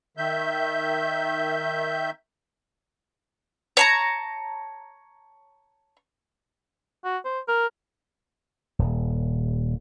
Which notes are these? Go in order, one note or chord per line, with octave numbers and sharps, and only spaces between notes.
D#3 E5 G6
C#5 A5 A#5
F#4
C5
A#4
D#1